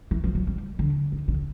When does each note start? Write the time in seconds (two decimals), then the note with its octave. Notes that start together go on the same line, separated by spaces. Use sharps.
0.11 E3
0.24 F3
0.35 F#3
0.47 G3
0.79 D3
1.12 D#3
1.28 D3